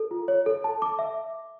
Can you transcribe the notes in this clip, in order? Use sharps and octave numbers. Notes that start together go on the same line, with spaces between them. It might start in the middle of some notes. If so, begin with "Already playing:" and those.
Already playing: A4
F4
C#5
A4
A5
D6
E5